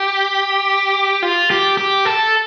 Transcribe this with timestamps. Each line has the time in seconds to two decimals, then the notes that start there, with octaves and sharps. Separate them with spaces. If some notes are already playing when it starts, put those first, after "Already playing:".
Already playing: G4
1.22 F4
1.50 G4
1.77 G4
2.05 A4